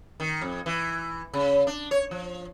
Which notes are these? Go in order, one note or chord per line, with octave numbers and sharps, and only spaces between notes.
D#3
F2
E3
C#3
D4
C#5
F3